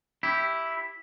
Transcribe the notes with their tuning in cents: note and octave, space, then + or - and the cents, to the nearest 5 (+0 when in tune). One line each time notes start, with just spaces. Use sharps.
E4 +0 G4 +0